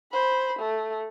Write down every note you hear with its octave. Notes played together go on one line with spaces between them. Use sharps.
C5 B5
A3